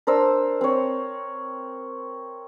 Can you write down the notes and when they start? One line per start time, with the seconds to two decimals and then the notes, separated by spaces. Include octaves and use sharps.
0.07 D4 A#4 C5 E6
0.61 C4 C#5